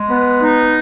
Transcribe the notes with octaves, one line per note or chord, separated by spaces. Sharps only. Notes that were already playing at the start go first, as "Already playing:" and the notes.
Already playing: G#3
B3
D#4